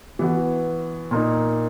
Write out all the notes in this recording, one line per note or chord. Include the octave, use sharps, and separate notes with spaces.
E3 B3 F#4
A#2 A#3 D#4